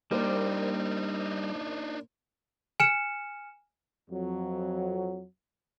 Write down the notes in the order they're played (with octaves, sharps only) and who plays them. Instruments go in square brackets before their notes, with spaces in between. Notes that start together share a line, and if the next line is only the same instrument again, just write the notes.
[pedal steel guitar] G3 [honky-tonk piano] A#3 A#4 C5 [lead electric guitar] D4 D#4
[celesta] G#5 F6 C#7 E7
[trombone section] F2 F#3